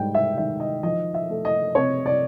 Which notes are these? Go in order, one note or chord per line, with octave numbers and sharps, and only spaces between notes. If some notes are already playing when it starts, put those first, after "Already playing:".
Already playing: G#2 G3 G5
E5
D#3 E5
D#5
F3 D#5
E5
A3
D#5
C3 C#5
D5